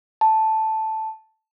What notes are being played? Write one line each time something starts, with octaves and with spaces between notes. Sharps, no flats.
A5